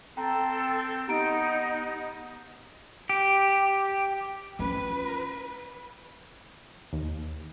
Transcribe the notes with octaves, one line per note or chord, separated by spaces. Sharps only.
C4 A4 G5 A#5
B3 D#4 G4 A#5 D7
G4
C#4 F4 B4
D#2